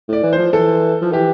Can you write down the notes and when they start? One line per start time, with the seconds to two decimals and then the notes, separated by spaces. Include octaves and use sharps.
0.09 A2 D5
0.23 E3
0.33 C5
0.38 F3
0.53 E3 A4
1.01 F3
1.13 E3 G4